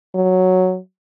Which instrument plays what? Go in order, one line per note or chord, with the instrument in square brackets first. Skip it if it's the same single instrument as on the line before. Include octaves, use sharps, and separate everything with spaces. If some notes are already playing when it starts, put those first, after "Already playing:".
[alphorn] F#3